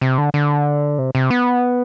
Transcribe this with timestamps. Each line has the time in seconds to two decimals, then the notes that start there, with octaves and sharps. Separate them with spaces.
0.01 C3
0.18 D3
0.34 D3
0.99 C3
1.15 C3
1.30 B3